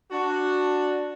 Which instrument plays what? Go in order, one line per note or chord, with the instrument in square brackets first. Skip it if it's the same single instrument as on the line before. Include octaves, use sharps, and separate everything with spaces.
[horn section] D4 F#4